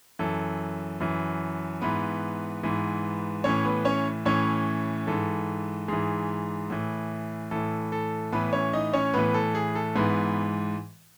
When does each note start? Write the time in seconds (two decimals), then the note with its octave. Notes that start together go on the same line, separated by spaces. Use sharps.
0.19 F#2 E3 A4
1.00 F#2 E3
1.82 G#2 E3 B3 B4
2.63 G#2 E3
3.44 A2 E3 C#4 C#5
3.65 B3 B4
3.85 C#4 C#5
4.25 A2 E3 C#4 C#5
5.07 G#2 E3 A4
5.88 G#2 E3 G#4
6.70 A2 E3
7.51 A2 E3 A4
7.92 A4
8.32 A2 E3 B3 B4
8.53 C#4 C#5
8.73 D#4 D#5
8.93 C#4 C#5
9.14 A2 E3 B3 B4
9.34 A4
9.55 G#4
9.75 A4
9.96 G#2 E3 B3 B4